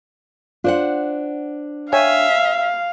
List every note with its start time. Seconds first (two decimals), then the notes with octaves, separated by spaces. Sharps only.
0.64 D4 F4 C5 F#5
1.93 C#5 E5 F5 G5 G#5